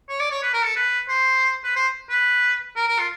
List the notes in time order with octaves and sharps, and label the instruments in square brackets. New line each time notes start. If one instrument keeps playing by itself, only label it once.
[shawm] C#5
D5
C#5
B4
A#4
A4
B4
C5
B4
C5
B4
A#4
A#4
F4